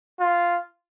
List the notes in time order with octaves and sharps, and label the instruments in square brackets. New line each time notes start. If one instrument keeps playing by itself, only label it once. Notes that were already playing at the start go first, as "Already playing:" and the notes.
[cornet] F4